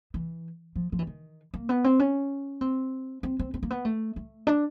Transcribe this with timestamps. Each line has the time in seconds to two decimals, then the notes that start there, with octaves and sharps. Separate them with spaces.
0.14 E3
0.76 F3
0.92 F3
0.99 E3
1.07 D#3
1.54 A#3
1.69 B3
1.84 C4
1.99 C#4
2.61 C4
3.23 C4
3.39 C4
3.54 C4
3.63 A#3
3.71 B3
3.85 A3
4.16 A3
4.47 D4